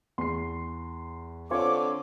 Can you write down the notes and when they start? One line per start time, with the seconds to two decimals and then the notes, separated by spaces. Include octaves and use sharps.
0.18 E2 C6 C7
1.51 D3 C4 F4 C#5 D6